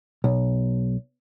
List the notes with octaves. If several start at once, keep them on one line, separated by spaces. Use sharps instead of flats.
B1